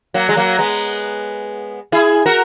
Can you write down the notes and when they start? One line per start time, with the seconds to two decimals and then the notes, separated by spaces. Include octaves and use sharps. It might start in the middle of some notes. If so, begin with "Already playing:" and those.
0.14 F#3 A#3
0.29 G#3
0.36 F#3 A#3
0.59 G#3 B3
1.92 E4 G#4
2.26 F#4 A#4